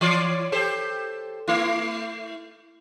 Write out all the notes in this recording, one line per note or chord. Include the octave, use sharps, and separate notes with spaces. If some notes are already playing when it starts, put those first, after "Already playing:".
E3 C#5 D5
G4 A4 C5
A3 E4